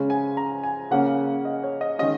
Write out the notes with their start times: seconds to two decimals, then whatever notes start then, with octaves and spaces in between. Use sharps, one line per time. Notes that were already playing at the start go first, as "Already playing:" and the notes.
Already playing: C#3 G#3 C#4
0.10 G#5
0.37 A#5
0.64 G#5
0.91 C#3 A#3 C#4 F#5
1.45 D#5
1.63 C#5
1.81 D#5
1.99 D#3 G#3 C#4 D#5